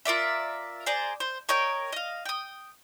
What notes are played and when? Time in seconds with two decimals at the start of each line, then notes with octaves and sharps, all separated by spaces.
0.05 F4 A#4 D5 E5
0.86 G#4 C5 D5 A#5
1.20 C5
1.49 A#4 C#5 D#5 G5
1.92 D#5 F5
2.25 G5 D#6